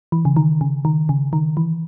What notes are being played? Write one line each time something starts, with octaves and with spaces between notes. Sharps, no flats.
E3
C#3
D#3
C#3
D#3
C#3
D#3
E3